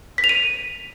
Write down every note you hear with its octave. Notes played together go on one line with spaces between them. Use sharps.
B6
F7
D#7